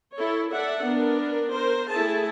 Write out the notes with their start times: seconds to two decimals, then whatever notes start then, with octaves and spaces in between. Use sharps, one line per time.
0.17 E4 A4 C#5
0.53 A4 D5 E5 F#5
0.84 B3 D4 A#4
1.52 A#4 C5
1.91 A3 E4 G#4 A5